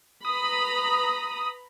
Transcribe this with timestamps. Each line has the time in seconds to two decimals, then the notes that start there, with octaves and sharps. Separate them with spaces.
0.25 B4 A#5 B5 D#6